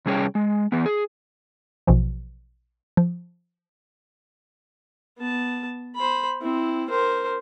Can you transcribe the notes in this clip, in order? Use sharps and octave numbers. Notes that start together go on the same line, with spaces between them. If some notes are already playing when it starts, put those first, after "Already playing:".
C3 G3 C#4 G#4 C#5 G5
G#3
E3 B3
G#4
A#1 B2 E3 F3
F3
B3 A5
C5 B5
C4 E4
A#4 C5